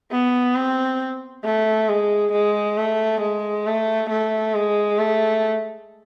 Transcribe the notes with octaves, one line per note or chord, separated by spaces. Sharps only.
B3
C4
A3
G#3
G#3
A3
G#3
A3
A3
G#3
A3